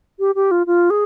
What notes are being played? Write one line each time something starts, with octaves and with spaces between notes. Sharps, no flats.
G4
G4
F4
F4
G#4